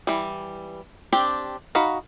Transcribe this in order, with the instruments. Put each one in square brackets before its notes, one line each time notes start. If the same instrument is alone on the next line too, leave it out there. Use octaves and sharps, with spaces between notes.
[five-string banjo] E3 G3
C4 D4 G4 G5
D#4 F#4 F5 B5